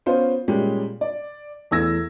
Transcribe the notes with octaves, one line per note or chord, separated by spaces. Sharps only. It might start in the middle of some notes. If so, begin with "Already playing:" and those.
B3 C#4 F4 C5
A#2 G3 G#3 C#4 G4
D5
E2 A3 E4 E6 G#6 A#6